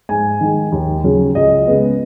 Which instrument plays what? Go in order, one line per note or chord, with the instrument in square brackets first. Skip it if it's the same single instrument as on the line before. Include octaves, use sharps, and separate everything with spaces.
[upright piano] G#2 G#5
D#3 G#3
D#2
C#3 F#3 C#4
C#2 D#5
C#3 G#3 B3